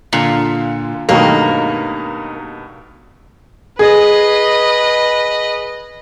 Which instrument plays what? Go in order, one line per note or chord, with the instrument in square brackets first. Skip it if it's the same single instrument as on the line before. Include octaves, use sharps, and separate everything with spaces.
[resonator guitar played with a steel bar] A#2 [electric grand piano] D3 F4
[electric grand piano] G2 B2 [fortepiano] D#3 F#3 A3 [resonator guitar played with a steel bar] A#3
[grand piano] G#4 [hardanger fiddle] B4 D#5